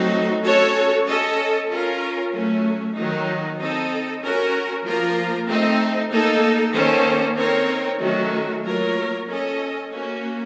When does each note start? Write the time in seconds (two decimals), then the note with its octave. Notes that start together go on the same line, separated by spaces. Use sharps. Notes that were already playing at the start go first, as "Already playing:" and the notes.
Already playing: F#3 A3 C4 D#4 F#4
0.43 C#4 F#4 A4 C#5
1.06 C#4 A4 D#5
1.69 C#4 F4 A#4
2.32 F#3 A3 C#4
2.96 D#3 F#3 A#3 D#4
3.59 C4 D#4 A4 D#5
4.22 C#4 F#4 A#4
4.85 F3 A#3 F4 A#4
5.48 A3 C4 D#4
6.11 A#3 D#4 A4
6.74 D#3 A#3 C#4 A4 C5
7.37 C4 D#4 A#4 C#5
8.00 D#3 F#3 A3 C#4 F#4
8.64 F#3 A#3 F4 A#4 C#5
9.27 C#4 A4 D#5
9.90 A#3 C#4 F#4